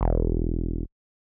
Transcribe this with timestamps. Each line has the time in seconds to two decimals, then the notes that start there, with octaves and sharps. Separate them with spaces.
0.01 E1